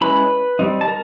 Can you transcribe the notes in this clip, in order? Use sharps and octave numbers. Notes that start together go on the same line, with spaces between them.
G#3 C#4 E4 B4 B5
G3 C4 D#4
A5
A#4